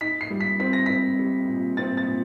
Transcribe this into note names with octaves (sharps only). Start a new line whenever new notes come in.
D#4 B6
C7
G3
B6
C4 B6
A#6
C4 B6
G3
A#2
C4 A6
A6
A#2